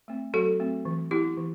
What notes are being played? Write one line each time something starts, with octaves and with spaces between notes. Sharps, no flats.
A3 C4
F#3 F#4 A4
A3 C4
E3
B3 E4 G4
E3